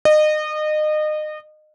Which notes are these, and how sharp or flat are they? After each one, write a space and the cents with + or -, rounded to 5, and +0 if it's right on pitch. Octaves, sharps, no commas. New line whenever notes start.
D#5 -30